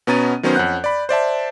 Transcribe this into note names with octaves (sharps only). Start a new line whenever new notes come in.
B2 B3 C#4 A#5 A6 D#7
D#3 F#3 B3 C#4 C5
F2 C#4 F#5 F#6 G6
D5 B5
C5 D5 E5 A5